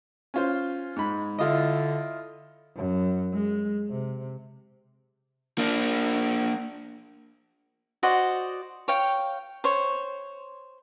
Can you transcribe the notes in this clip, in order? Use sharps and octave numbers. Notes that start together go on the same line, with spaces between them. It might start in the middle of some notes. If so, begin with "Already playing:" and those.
C#4 F4 C5
G#2 G#3 B5
D3 E4 F4 D#5
F#2
G#3
C3
A#3 D4
F#4 C5 D5 D#5
C#5 F5 G5
C5 C#5